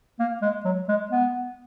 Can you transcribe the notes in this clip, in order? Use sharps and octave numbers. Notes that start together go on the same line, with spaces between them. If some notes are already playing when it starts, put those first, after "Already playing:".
A#3
G#3
F#3
G#3
B3